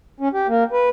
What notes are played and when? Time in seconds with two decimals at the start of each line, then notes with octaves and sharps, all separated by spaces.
0.20 C#4
0.33 G4
0.48 A#3
0.72 B4